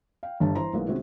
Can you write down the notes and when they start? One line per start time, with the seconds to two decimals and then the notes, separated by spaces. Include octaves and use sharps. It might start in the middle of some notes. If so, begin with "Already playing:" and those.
0.23 F5 G5
0.40 G1 G2 A5
0.55 E3 C5 A#5 C6
0.73 B1 G#3 A#3 B3 E4
0.88 C3 D#3 G#3 C4 C#4 F#4